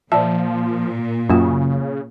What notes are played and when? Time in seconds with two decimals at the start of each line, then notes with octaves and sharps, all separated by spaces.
0.12 A#2 F3 D5 E5 A5
1.30 F#2 C#3 A#3 F4